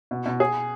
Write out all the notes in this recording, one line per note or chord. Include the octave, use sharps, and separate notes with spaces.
B2
B2
G#4